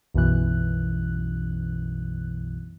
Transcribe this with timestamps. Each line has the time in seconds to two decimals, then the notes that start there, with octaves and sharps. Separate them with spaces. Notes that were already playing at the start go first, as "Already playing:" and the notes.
0.14 B1 F#2 B2 E3 F#6